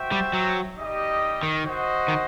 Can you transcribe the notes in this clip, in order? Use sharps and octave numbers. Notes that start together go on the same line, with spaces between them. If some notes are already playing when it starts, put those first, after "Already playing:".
Already playing: F#4 C5 E5 G5
G3
F#3
G3 D#4 G4 D#5
D#3
F#4 C5 D#5 F#5
D#3